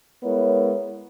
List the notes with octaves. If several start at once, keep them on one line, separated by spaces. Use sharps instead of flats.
G#3 B3 E4 A#4 C#5